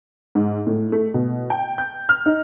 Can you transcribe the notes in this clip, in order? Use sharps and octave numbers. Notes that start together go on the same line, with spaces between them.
G#2
A2
A3
B2
G5
G6
F6
D#4